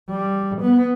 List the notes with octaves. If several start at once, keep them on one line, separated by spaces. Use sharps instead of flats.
G3
B3